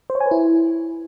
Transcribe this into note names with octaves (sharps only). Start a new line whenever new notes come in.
C5
C#5
G#5
B4
E4